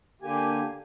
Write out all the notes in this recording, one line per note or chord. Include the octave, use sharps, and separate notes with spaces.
D3 A#3 G4 G#5